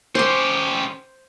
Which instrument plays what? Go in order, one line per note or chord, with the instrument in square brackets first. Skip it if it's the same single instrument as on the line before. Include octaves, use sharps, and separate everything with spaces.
[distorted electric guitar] C#4 G4 [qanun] C5 C6